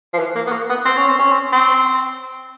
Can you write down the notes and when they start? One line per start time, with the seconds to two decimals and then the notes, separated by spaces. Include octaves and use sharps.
0.14 F3
0.19 E3
0.35 A#3
0.47 B3
0.52 A#3
0.69 B3
0.85 C4
0.97 C#4
1.08 C4
1.19 C#4
1.31 C4
1.52 C4